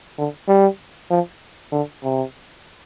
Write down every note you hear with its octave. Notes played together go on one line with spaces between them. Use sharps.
D3
G3
F3
D3
C3